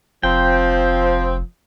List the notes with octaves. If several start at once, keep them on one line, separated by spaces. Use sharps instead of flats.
F1 F3 C4 G5